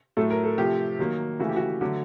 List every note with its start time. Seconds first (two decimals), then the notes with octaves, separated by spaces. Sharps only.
0.17 A2 F#3 A3 A4
0.31 A#4
0.44 A4
0.57 C3 F3 A3 G4
0.99 D#3 F#3 A#3
1.40 C#3 E3 A3 F#4
1.49 G4
1.57 F#4
1.81 D3 F#3 A3